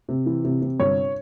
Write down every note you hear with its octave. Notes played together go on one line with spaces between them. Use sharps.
C3
E3
C3
C3
G1 C#5